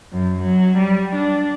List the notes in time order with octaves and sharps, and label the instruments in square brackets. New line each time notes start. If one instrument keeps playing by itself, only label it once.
[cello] F#2
F#3
G3
D4